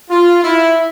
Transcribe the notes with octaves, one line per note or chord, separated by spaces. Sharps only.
F4
E4